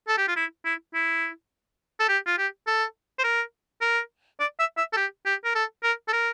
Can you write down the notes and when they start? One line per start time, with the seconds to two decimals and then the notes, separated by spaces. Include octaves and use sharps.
0.08 A4
0.18 G4
0.27 F4
0.36 E4
0.65 E4
0.94 E4
2.00 A4
2.09 G4
2.26 F4
2.38 G4
2.67 A4
3.19 C5
3.24 A#4
3.81 A#4
4.40 D5
4.59 E5
4.77 E5
4.93 A4
4.97 G4
5.25 G4
5.44 A#4
5.55 A4
5.83 A#4
6.08 A4
6.13 A#4